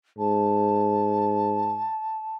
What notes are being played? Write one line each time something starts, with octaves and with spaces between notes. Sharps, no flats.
G#2 A5